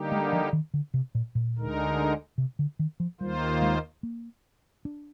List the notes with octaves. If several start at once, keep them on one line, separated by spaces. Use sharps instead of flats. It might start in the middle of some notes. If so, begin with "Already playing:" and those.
Already playing: D3 G3 A#3 D#4 G4
G#3
F3
D#3
D3
C3
A#2
A#2
D2 D3 G#3 D#4 A#4
C3
D3
D#3
F3
D#2 D#3 G3 A#3 F4 C5
G#3
A#3
D4